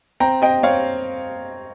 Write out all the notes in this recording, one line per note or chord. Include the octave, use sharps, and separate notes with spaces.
C4 G5 A#5
C4 D#5 G5
C4 C#5 F5